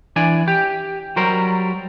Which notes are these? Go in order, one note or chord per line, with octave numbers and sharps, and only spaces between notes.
E3 D4 D5 G#5
G4
F#3 G3 A#4 C5